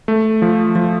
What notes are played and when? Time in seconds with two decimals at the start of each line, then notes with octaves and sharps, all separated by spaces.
0.08 A3
0.42 F3
0.75 F3